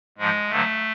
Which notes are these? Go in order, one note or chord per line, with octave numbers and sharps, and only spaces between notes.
G#2 F3 G#3
G2 D3 F#3 A3